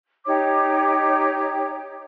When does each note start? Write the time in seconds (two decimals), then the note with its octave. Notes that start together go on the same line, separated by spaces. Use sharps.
0.25 D#4 G4 C#5 D6